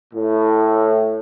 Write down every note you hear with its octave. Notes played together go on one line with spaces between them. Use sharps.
A2